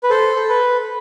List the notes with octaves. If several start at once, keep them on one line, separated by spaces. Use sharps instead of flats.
B4
A4 C5
A4
B4